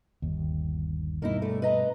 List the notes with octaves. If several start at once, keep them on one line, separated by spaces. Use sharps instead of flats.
G1 D#2
G2 B2 A#3 D#4 E4
A#2 A3
B4 D#5 A#5